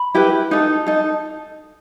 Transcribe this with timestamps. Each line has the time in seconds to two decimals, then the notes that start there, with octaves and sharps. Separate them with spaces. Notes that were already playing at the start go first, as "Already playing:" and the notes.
Already playing: B5
0.15 E4 G4 B4
0.51 D#4 A4
0.87 D#4 A4